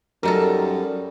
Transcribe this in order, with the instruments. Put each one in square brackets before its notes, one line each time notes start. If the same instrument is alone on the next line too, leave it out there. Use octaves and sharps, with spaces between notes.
[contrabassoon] F#2 [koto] F#3 D#4 A4 [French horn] G3 [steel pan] A#4